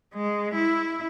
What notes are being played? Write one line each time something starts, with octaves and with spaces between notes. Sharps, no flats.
G#3
E4